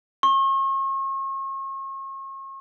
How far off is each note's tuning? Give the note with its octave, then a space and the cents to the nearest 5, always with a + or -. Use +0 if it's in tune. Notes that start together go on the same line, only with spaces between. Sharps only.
C#6 -40